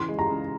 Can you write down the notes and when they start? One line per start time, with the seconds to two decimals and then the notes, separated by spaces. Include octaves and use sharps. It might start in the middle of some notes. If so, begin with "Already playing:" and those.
Already playing: C#3 E3 C6
0.08 G#3
0.19 A#5
0.30 C#3